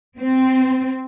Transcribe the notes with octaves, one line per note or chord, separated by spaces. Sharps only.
C4